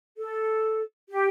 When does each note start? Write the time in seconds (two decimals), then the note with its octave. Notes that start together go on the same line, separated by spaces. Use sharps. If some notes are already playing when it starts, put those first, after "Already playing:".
0.17 A4
1.09 G4